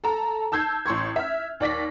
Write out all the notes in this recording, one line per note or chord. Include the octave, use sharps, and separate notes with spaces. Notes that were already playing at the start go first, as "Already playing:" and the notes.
A4 A5 A#5
A5 E6 G6 G#6 C7
A1 C6 C#6 G#6
E5 F6
D#2 D5 A#6 B6